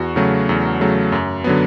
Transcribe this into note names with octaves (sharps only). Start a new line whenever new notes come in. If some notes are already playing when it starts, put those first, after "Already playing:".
Already playing: E2 F#4
C#3 F#3 A3
E2
C#3 F#3 A3
F#2
D3 F#3 B3